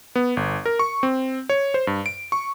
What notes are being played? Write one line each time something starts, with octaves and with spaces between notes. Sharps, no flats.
B3
G1
A#4
C#6
C4
C#5
C5
G2
D7
C#6